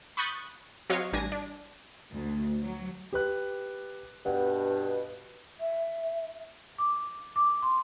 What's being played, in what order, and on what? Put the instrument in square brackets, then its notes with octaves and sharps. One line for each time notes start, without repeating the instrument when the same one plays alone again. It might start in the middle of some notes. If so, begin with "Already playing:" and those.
[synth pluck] B5 C#6 D#6 F#6 G6 A6
F#3 C4 F#4 C#5 D#5 F5
A1 G3 D4 G#5 A#6
D4
[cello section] D2
F#3
[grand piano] G4 B4 F#6
[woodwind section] G2 B2 [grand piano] F#5
[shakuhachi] E5
[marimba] D6
D6
C6